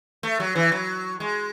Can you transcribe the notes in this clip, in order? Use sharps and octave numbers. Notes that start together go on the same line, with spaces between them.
A3
F#3
E3
F#3
G#3